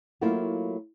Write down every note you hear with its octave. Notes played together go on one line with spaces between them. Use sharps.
F#3 A3 A#3 E4 F4